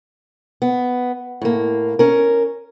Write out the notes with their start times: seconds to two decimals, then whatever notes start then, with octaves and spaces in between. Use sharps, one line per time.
0.62 B3
1.42 A2 A#3
1.99 C#4 A#4